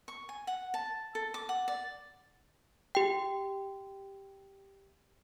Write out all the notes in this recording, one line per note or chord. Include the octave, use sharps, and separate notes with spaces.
C#6
G#5
F#5
A5
A4
D6
F#5
D5
G4 G5